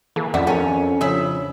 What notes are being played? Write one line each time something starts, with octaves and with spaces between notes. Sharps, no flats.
E3 A#3 G#4 A4
F2 E3 F3 C#4 E4 D5 E5 F#5
C#4 D4 A4 A#4
C#3 F3 D4 E4 E5